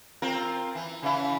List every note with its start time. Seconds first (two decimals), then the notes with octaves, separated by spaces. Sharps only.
0.22 C4 F4 A#4
0.75 E3
1.02 C#3 E3 E4